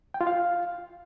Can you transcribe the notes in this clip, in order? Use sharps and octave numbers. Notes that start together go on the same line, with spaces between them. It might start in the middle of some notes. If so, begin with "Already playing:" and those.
G5
F4
F5